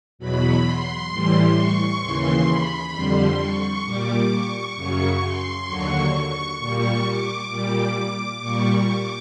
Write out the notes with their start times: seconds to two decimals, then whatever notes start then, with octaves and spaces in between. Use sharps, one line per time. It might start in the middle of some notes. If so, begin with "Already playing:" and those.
0.19 E2 B2 F#3 B5
0.65 C6
1.10 A2 E3 G3
1.55 C#6
2.01 D#2 C#3 E3 C6
2.47 B5
2.93 F2 D3 G3 C6
3.39 C#6
3.85 A#2 G3 D6
4.30 C#6
4.76 F#2 C#3 F#3 C#6
5.22 C6
5.67 D#2 D3 F#3 C#6
6.13 C#6
6.58 A#2 G3 C#6
7.04 D6
7.50 A#2 G3
8.41 A#2 G3 C#6
8.87 D6